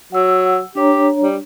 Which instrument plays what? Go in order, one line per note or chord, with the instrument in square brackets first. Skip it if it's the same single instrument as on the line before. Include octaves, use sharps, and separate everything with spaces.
[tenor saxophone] F#3 [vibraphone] F#5 E6
[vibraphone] D4 C#5 A#5 [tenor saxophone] G4
[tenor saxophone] G3